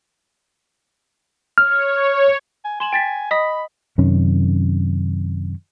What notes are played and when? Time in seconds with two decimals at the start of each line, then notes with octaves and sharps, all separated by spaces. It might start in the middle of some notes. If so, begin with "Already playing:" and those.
1.58 C#5 F6
2.65 G#5
2.80 G#5 C6 E7 F#7
2.93 G5 A6 B6
3.31 D#5 B5 D#6 B6
3.98 F#2 C3 D#3 C#4